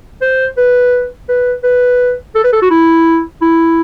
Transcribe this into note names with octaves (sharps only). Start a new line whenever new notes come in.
C5
B4
B4
B4
A4
B4
A4
F#4
E4
E4